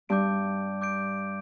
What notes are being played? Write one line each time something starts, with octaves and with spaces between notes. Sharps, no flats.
G2 D6 G6 D7
D6 G6 D7